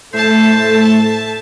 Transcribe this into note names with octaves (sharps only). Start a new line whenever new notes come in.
A2 A3 A4 C5 E5 A5